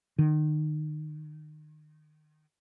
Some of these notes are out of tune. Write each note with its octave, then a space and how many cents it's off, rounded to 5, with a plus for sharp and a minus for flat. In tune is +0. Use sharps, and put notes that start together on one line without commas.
D#3 -30